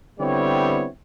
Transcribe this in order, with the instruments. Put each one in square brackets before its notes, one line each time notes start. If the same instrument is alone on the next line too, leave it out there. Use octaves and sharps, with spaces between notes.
[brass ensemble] D3 G3 B3 C4 E4 C#5